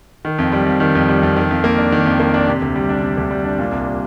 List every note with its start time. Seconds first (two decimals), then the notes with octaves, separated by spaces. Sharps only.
0.25 D#3
0.38 F2
0.52 G3
0.66 F2
0.80 D#3
0.95 F2
1.09 G3
1.23 F2
1.37 D#3
1.51 F2
1.64 A#3
1.78 D4
1.92 D#3
2.06 F2
2.20 A#3
2.34 D4
2.47 C3
2.62 D2
2.76 G3
2.89 D4
3.02 C3
3.17 D2
3.31 G3
3.44 D4
3.59 A#2
3.72 C2
3.87 G3